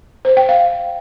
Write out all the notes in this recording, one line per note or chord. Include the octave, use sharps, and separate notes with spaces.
C5
G5
F5